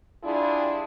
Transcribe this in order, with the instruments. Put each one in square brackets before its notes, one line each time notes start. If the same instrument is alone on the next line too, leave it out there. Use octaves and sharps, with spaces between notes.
[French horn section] G3 D4 E4 F4 G#4